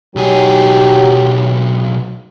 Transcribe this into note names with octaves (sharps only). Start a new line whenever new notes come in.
B1 F#3 D#4 G4 G#4